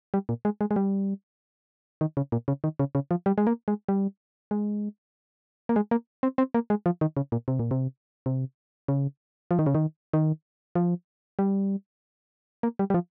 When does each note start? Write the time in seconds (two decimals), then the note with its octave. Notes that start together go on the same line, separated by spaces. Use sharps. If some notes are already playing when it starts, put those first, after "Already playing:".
0.14 G3
0.29 A#2
0.45 G#3
0.61 G#3
0.71 G#3
0.76 G3
2.01 D#3
2.17 C#3
2.32 A#2
2.48 C#3
2.64 D#3
2.79 C#3
2.95 C#3
3.11 F3
3.26 G3
3.38 G#3
3.47 A#3
3.68 G#3
3.89 G3
4.51 G#3
5.69 A#3
5.76 G#3
5.91 A#3
6.23 C4
6.38 C4
6.54 A#3
6.70 G#3
6.86 F3
7.01 D#3
7.17 C#3
7.32 A#2
7.48 C3
7.59 A#2
7.71 C3
8.26 C3
8.88 C#3
9.51 F3
9.59 D#3
9.66 C#3
9.75 D#3
10.13 D#3
10.75 F3
11.39 G3
12.63 A#3
12.79 G3
12.90 G3
12.94 F3